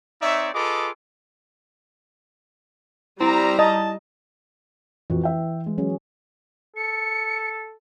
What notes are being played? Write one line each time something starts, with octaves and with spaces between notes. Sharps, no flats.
C4 D#4 C#5 D5 E5
F4 G#4 A4 B4 D#5 D6
G3 C4 E4 A#5
D#5 A5
F2 E3 F#4
E5 G5
G#3
F#3 C#4 G#4
A4 C#7